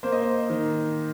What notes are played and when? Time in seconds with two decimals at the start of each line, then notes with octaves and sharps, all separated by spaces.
0.03 A#3 C5
0.12 D#5
0.22 C5
0.50 D#3